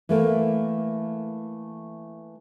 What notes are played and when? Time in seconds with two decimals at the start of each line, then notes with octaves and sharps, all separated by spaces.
0.09 E3 A3 A#3